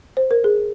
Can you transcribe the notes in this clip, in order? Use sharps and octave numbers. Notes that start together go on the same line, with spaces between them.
C5
A#4
G#4